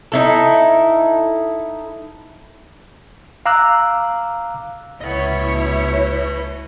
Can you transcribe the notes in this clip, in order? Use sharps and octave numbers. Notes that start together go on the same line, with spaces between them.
D#4 E4 A4
F5 A#5 D6 E6 F#6
C#2 E4 B4 C#5 D#5